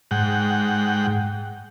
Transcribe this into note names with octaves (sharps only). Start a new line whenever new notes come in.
G#2 F#5 G5